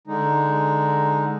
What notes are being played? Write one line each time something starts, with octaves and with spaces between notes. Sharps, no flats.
D3 G#3 D#4